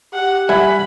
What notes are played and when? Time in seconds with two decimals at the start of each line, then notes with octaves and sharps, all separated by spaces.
0.13 G4 F#5
0.49 G3 E5 F#5 G#5 B5